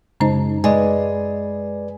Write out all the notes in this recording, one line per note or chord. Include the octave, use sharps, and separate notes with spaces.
F#2 C#3 G#3 D#4 C5 A5
G#3 B4 D5 D#5 G#5